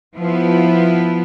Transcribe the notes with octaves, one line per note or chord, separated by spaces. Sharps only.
F3 B3 E4 F4